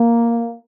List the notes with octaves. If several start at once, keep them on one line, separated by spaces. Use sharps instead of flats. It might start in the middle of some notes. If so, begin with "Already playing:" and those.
Already playing: A#3